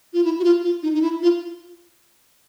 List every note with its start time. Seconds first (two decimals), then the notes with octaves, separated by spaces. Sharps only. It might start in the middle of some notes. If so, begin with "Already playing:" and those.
0.14 F4
0.24 E4
0.39 F#4
0.44 F4
0.64 F4
0.83 D#4
0.94 D#4
1.02 E4
1.22 F4